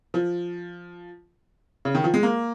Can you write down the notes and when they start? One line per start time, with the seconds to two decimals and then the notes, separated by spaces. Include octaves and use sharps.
0.14 F3
1.85 C#3
1.95 D#3
2.04 F3
2.14 G#3
2.23 A#3